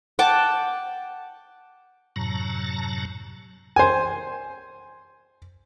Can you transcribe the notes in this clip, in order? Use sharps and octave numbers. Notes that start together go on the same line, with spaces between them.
F#5 G5 A5 D6
F#2 A2 C3 F#3 A5 A#5
C5 G#5